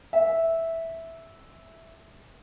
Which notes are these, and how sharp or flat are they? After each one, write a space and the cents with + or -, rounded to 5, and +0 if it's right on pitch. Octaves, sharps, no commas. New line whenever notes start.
E5 -5